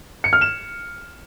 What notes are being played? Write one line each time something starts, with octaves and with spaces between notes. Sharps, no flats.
C#7
F6
E7